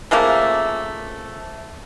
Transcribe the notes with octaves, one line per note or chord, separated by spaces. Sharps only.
C#3 F3 A3 A#3